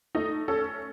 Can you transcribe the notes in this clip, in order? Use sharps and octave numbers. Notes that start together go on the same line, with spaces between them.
A3 D#4
C#4 A4